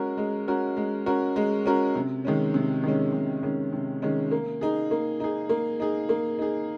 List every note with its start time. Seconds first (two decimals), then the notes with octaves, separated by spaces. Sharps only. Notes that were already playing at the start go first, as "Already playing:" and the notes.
Already playing: G#3 C#4 F#4 A#4
0.17 G#3
0.48 C#4 F#4 A#4
0.77 G#3
1.06 C#4 F#4 A#4
1.36 G#3
1.66 C#4 F#4 A#4
1.95 C3
2.25 D#3 G#3 C#4
2.54 C3
2.83 D#3 G#3 C#4
3.13 C3
3.43 D#3 G#3 C#4
3.73 C3
4.02 D#3 G#3 C#4
4.31 A#3
4.61 D#4 G#4
4.91 A#3
5.20 D#4 G#4
5.49 A#3
5.80 D#4 G#4
6.09 A#3
6.39 D#4 G#4